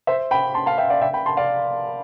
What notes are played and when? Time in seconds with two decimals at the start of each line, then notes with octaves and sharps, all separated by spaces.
0.07 C5 E5
0.31 G5 B5
0.55 A5 C6
0.66 F5 A5
0.78 E5 G5
0.90 D5 F5
1.01 E5 G5
1.13 G5 B5
1.26 A5 C6
1.37 D5 F5